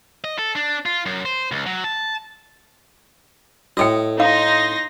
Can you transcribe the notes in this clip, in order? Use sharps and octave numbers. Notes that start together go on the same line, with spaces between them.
D#5
A4
D4
F4
F#2
C5
C#2
F#3
A5
A2 F#4 A4 D#5 G5
D#4 F5 C6 A#6